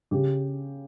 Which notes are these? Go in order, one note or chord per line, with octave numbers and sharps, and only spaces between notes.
C#3 G4